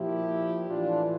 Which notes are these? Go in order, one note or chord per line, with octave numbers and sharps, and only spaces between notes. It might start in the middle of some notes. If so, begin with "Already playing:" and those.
Already playing: A#2 F3 E4 G4
A2 E3 D4 F4